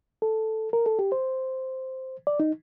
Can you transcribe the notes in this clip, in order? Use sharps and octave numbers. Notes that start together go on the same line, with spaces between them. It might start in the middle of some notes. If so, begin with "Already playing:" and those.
A4
A#4
A4
G4
C5
D5
D#4